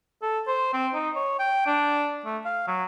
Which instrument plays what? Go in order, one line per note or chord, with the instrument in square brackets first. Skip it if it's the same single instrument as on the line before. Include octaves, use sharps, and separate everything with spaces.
[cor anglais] A4
C5
C4
D#4
C#5
G5
D4
A3
F5
F#3